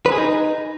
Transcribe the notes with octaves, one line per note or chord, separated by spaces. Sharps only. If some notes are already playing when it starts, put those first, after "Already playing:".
B4
G#4
D#4